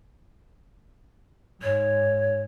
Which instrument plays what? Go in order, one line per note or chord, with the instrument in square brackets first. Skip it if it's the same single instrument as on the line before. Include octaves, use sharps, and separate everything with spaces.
[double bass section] G#2 [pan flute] C#5